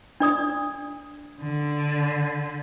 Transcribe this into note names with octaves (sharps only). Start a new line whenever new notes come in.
D4 D5 D#6
D3